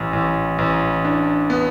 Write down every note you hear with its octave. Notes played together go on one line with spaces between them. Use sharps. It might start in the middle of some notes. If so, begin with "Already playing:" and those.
Already playing: A1
A1
A1
D4
B3